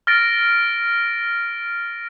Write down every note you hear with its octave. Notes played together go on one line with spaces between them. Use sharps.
F6 A6 A#6 D7